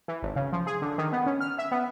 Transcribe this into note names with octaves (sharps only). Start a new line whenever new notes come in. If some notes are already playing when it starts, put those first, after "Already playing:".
E3
G#1
C#3
F3
G#4
D3
D#3
B3
C#4
F6
E5
B3